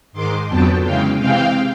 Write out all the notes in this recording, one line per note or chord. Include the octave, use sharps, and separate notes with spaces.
G#2 D#3 G#3 C6 D6
F2 D3 F#3 B3 G5 A5
C#3 E3 G#3 F5 G5
C3 E3 G#3 C4 F5 G5